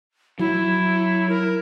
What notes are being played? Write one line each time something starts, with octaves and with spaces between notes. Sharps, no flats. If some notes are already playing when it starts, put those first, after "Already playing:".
F#3 E4
A#4